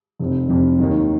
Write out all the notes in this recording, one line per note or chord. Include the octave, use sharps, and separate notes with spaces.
F1 F2 C3
F1 F2 C3
D#2 D#3 F#3